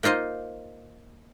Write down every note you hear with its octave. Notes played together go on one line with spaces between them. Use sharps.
A#3 D#4 F4 C5 D#5